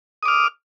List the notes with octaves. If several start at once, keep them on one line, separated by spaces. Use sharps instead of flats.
D6 D#6 F6